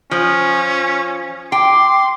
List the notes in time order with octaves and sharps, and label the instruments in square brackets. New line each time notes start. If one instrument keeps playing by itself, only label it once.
[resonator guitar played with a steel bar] F3 [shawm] C#4
[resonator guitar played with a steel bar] G5 [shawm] C6 [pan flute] D6